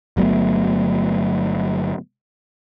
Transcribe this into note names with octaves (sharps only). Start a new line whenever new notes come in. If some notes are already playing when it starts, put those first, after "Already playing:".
G1 F#3 A3 B3